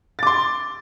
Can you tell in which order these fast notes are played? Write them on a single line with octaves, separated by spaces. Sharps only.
A6 D6 C6